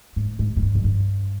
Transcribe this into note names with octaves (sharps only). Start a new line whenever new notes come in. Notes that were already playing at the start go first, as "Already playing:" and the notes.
G#2
G#2
G#2
G2
F2
G2